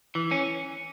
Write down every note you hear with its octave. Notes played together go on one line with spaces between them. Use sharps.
E3
C#4